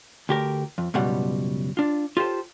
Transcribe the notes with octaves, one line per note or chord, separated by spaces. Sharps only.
D2 G4 A#4
F2
C#2 F#2 B2 G3 F#5
D4 F4
F4 G4 A4 C5